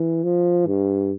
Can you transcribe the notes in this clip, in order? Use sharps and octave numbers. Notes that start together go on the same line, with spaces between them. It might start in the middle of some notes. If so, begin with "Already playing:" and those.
Already playing: E3
F3
G2